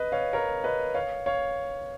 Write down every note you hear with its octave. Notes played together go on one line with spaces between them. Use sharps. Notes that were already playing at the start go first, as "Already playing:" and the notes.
Already playing: B4 D#5
C#5 F5
A#4 C#5
B4 D#5
C#5 F5
C#5 F5